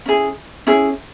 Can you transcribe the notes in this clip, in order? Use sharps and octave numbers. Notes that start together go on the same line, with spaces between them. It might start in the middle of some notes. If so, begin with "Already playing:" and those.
C#4 E4 G#4
C#4 E4 G#4